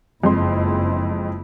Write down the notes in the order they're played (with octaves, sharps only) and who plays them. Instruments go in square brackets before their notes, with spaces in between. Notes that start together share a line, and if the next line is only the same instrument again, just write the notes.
[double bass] F#1 E4 [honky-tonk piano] F2 G#3 C6